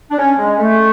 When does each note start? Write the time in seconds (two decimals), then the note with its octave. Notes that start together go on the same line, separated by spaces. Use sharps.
0.10 D4
0.18 C#4
0.38 G#3
0.58 A3